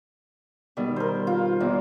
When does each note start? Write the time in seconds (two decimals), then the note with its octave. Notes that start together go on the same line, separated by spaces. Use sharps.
0.77 B2 D#3 G3
0.96 A#4 C5
1.27 F4
1.60 E2 C3 D#3